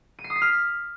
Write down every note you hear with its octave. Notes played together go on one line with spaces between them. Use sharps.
D#7
C7
D#6
B6
F6